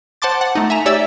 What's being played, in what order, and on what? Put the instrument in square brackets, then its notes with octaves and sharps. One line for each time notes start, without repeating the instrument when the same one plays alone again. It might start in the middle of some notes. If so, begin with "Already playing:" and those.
[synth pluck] C5 F#5 A5 C6 D6 A6
F#5
A3 D#4
E5 G#5 A#5
G4 C#5 D5 E5 E6